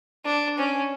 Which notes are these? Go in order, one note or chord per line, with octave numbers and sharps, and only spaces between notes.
D4
C#4